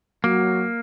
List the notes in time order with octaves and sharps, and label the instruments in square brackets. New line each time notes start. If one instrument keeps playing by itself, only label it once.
[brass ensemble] F#3 F#4 [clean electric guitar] A#3